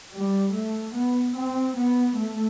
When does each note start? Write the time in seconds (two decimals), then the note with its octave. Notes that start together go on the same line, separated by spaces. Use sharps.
0.13 G3
0.54 A3
0.95 B3
1.36 C4
1.77 B3
2.18 A3